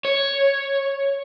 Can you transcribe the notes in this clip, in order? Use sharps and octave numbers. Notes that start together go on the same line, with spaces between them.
C#5